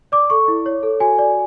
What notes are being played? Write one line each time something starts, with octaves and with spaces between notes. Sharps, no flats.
D5 D6
A4 C#6
E4
C#5
A4
F#4 G#5
D5